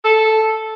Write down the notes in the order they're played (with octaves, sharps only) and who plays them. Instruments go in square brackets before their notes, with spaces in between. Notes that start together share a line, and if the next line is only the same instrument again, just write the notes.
[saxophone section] A4